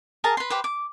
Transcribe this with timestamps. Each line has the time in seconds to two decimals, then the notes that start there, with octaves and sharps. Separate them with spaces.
0.24 G#4 A#4 A5 A#5
0.37 B4 C6
0.50 G4 B4 C5
0.64 D6